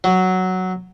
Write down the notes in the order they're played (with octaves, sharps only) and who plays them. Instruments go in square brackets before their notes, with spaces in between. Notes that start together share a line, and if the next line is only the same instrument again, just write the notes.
[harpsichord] F#3